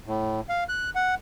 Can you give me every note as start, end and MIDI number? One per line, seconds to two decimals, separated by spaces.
0.06 0.41 45
0.49 0.64 77
0.69 0.90 90
0.95 1.15 78